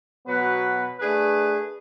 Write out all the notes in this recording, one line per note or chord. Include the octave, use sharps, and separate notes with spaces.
B2 F#3 B3 F#4 B4
A3 D4 G#4 B4